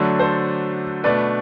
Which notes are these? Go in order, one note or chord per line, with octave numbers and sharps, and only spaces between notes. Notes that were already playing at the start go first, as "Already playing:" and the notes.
Already playing: D3 F#3 A3 D4
A4 C5
B2 A3 D4 B4 D5